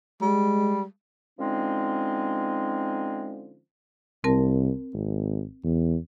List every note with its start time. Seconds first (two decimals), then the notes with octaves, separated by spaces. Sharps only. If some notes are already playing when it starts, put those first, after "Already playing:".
0.21 G3 G#3
1.39 D3 F3 G#3 C4 C#4 D#4
4.24 C2 C4 A#4 A5
4.93 G#1
5.64 E2